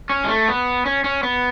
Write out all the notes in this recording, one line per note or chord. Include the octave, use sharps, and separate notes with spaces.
C#4
G#3
A3
B3
C#4
C#4
B3